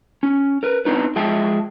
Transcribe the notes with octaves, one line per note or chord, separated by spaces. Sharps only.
C#4
A#4 B4
B3 C4 D4 D#4 B4
F3 G#3 E5 G5 A5